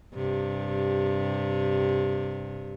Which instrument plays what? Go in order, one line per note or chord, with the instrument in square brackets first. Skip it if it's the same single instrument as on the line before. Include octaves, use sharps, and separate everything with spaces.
[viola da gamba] G2 C3